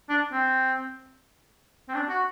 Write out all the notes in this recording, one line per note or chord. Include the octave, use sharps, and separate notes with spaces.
D4
C4
C4
D4
F#4